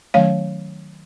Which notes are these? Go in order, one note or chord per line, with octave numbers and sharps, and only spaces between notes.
D#3 F#3 A3 C#4 C#5 F5